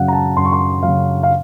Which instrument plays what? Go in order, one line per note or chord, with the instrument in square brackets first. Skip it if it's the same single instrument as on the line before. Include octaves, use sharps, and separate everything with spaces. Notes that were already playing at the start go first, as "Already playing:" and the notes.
Already playing: [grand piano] F#2 C#3 F#3 F5 F#5
A#5
A5
F#2 C6
C#6
C6
C#3 F#3 F5
F5